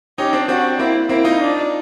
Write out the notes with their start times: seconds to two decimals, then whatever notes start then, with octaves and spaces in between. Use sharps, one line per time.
0.18 C#4 D#4 G4
0.33 C4 D4
0.48 C4 D4 F#4
0.79 A#3 C4 E4
1.09 A#3 C4 E4
1.24 D#4 F4
1.39 D4